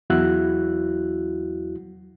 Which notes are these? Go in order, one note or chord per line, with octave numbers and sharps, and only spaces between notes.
E2 F#3 E4 F#4 E6 F#6